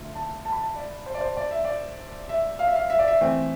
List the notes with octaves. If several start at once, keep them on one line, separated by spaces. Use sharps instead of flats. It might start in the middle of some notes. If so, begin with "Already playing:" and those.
Already playing: D3 A3 F4
A5
A5
B5
A5
D5
C5
D5
C5
D5
E5
D5
E5
F5
E5
F5
E5
D5
E5
E3 A3 C4